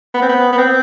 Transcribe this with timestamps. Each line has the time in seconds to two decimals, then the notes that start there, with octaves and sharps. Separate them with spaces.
0.15 B3
0.22 C4
0.29 B3
0.52 B3
0.58 C4